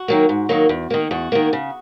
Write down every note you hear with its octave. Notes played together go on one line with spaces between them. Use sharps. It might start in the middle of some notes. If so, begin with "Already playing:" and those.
Already playing: F#4
D#3 F#3 A#3
G#2
D#3 F#3 A#3
E2
D#3 A#3
E2 F#4
D#3 A#3
C#3